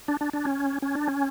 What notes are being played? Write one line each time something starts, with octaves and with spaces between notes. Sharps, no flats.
D4
D4
D4
C#4
C#4
D4
C#4